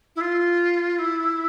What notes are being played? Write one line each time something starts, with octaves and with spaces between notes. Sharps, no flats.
E4
F4
E4